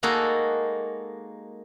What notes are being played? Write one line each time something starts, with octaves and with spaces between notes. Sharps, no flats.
G#3 A#3 D#4 F#4 A4 A#4